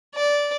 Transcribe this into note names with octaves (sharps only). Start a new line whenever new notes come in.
D5